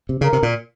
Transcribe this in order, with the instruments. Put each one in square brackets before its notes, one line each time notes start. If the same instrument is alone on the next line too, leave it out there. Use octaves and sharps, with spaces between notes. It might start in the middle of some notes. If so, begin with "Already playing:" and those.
[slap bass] C3
[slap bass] C#3 [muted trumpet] A#4
[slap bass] C3
A#2